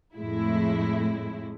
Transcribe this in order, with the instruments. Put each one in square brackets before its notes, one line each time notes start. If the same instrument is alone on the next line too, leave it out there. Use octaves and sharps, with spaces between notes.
[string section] F2 A2 G#3 E4